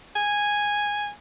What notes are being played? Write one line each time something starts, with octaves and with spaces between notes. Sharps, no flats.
G#5